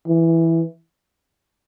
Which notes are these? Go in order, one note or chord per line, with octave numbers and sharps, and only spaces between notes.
E3